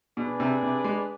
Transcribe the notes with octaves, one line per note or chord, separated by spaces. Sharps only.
B2 D4 G#4 B4 D5
C3
C3
G#3